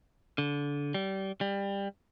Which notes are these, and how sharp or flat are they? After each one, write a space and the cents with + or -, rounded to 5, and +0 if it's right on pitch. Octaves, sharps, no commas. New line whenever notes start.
D3 -25
G3 -25
G3 +20